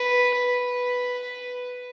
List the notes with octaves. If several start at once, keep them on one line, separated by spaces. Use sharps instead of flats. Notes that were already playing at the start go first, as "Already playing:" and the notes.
Already playing: B4
B4